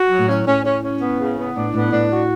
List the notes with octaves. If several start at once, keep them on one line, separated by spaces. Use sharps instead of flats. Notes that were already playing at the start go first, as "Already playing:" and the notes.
Already playing: F#4
F#3
A2
C#4
A2 C#4
C#4
C#4
B3
C#3
B3
A2 D4
A2 B3
A2 D4
F#4